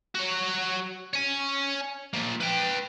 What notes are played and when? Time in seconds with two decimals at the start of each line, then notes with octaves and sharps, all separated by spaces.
0.15 F#4 C#5
1.13 C#5 G#5
2.13 F3 A#3
2.40 B4 G5